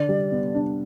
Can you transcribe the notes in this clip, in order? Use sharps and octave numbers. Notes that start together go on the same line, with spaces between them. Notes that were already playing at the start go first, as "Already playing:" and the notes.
Already playing: D3 D5
G3
B3
D4